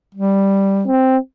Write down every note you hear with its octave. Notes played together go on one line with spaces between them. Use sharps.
G3
C4